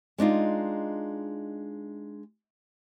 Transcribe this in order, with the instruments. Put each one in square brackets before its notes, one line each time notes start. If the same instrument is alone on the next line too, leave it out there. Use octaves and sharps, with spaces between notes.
[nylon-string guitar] G#3 D4 D#4 F4